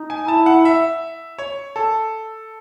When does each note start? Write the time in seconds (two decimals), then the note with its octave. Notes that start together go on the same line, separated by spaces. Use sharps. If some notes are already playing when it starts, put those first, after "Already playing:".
Already playing: D#4
0.10 G#5
0.28 E4 A5
0.46 F#5
0.65 E5
1.38 C#5
1.76 A4